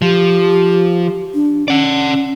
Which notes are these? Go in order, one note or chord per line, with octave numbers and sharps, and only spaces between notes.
F3 G4
D4
C#4 D5 F#5